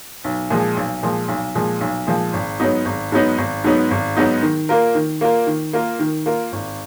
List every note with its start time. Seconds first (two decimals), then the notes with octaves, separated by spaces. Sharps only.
0.24 B1
0.50 A#2 F3 G#3
0.76 B1
1.03 A#2 F3 G#3
1.28 B1
1.55 A#2 F3 G#3
1.81 B1
2.07 A#2 F3 G#3
2.33 G#1
2.60 G#2 F#3 B3 D#4
2.85 G#1
3.12 G#2 F#3 B3 D#4
3.38 G#1
3.64 G#2 F#3 B3 D#4
3.91 G#1
4.17 G#2 F#3 B3 D#4
4.42 D#3
4.69 A#3 F4 A#4
4.95 D#3
5.21 A#3 F4 A#4
5.47 D#3
5.73 A#3 F4 A#4
5.99 D#3
6.26 A#3 F4 A#4
6.52 G#1